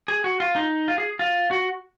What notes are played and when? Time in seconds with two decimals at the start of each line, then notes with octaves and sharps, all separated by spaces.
0.08 G#4
0.24 F#4
0.40 F4
0.56 D#4
0.88 F4
0.98 G#4
1.19 F4
1.51 F#4